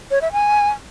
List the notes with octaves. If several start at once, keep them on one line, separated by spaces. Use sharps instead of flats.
C#5
E5
G#5